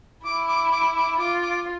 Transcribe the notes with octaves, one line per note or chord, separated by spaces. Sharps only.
E4 D6
D6
D6
D6
F4 D6
D6